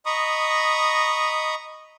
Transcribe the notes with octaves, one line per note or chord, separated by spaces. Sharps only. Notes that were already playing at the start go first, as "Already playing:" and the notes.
D#5 A#5 B5 C#6 D#6